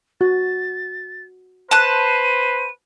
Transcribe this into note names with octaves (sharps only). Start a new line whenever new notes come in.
F#4 A6
B4 C5 A5 F#6 D#7